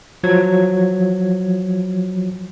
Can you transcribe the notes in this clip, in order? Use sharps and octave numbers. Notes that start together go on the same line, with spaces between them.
F3 F#3 G#6